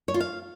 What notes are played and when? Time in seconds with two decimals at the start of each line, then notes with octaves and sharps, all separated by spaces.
0.08 C#5
0.14 F4
0.20 F5